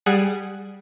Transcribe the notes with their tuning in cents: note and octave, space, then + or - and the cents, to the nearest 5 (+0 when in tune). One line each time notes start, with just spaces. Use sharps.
G3 +0 G#4 +0 F#5 +0